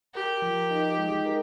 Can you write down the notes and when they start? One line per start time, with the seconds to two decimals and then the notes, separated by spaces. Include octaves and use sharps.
0.15 G4 A#4
0.42 F3
0.71 D#4
0.98 G#3
1.26 A#4